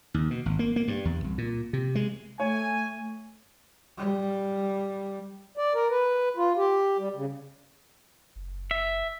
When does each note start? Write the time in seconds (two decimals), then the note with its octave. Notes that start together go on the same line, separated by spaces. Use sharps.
0.14 D#2
0.30 B2
0.46 G#1
0.59 A#3
0.76 A#3
0.88 G2
1.05 E2
1.24 C2
1.38 A#2
1.73 C3
1.95 G#3
2.40 A3 C#5 G#5
3.98 G3
5.57 D5
5.75 A#4
5.90 B4
6.37 F4
6.56 G4
6.98 G3
7.15 C#3
8.36 F#1
8.71 E5